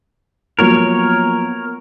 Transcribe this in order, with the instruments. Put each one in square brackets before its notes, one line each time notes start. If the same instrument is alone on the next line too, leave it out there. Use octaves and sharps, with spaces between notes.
[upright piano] F3 F#3 A#3 [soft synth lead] B3 [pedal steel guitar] A#4 C#5